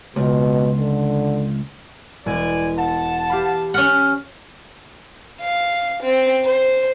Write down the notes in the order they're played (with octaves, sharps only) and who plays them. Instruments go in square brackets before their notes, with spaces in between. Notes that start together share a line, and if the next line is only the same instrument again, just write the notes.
[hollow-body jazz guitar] C#2 [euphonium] B2
[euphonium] D3
[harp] E1 [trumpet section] D5 G#5
[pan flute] F#5 [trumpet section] A5
[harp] G4 F5 B5
[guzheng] C#4 F#5 [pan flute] F6 [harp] A6
[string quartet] F5
C4
C5